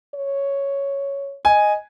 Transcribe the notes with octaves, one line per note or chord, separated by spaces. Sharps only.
C#5
D#5 G#5